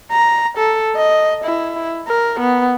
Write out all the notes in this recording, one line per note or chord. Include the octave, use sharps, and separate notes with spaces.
A#5
A4
D#5
E4
A#4
B3